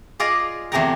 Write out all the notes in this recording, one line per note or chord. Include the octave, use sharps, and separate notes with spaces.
F4 G#4 D5 D#5 F5
E2 C3 A3 G#4 G5 A#5